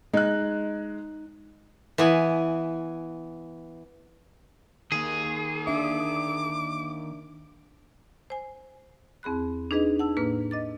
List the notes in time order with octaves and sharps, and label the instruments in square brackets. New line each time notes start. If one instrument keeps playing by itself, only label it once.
[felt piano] G#3 F#6 [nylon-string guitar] D#4
[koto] E3 B3 G#5
[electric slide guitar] D#3 A#3 [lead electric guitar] G#4
[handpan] D4 E5 [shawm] D6
[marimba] C5 G#5
E2 C4 G#4 B5 F#6
D4 D#4 G#4 B4 D#5
F#5 A5 E6
A2 A#3 D4 B4 F6
D#5 D6 A6